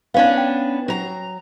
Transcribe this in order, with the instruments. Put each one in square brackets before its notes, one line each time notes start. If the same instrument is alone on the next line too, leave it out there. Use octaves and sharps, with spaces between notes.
[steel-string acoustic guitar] B3 C#4 D4 [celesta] F5
[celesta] G5
[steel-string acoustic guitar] F#3 A#5